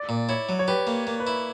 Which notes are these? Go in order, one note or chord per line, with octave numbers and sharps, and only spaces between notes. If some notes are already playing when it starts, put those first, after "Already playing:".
Already playing: D5
A#2
E4 C#5
F#3
C#5
G4 B4
A#3
A#3
B4
E4